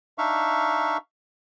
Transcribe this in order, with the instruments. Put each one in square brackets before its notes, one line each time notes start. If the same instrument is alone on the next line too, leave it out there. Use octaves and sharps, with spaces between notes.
[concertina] D4 D#4 E5 F5 C#6